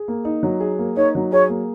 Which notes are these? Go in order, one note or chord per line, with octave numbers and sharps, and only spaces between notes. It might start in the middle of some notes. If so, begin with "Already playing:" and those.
Already playing: G#4
A#3
D#4
F#3
G#4
A#3
D#4 C#5
F#3
G#4 C#5
A#3